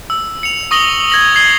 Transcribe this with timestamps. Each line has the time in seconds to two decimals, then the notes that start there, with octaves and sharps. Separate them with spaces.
0.10 E6
0.43 C#7 F7
0.71 C#6 D#6 A#6 F#7 G7
1.10 G#6 A#6 F#7
1.35 G#6 C7 G7